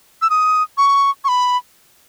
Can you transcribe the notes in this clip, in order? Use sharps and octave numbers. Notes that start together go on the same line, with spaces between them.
E6
D#6
C#6
C#6
B5